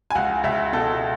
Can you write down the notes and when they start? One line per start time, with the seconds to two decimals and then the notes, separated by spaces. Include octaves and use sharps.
0.10 G#5
0.15 C#2 F#5
0.43 C#2 E5
0.73 B2 A4